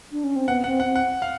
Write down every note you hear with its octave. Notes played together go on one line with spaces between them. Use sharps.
D4
C#4
C4
B3 F#5
F#5
C4
F#5
C4
F#5
F5